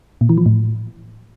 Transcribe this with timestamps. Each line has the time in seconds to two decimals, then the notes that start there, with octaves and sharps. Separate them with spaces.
0.21 A#2
0.29 E3
0.38 F3
0.46 A2